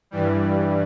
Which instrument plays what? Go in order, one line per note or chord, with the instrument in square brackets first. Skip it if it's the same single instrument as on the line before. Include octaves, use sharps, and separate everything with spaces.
[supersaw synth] G2 E3 G3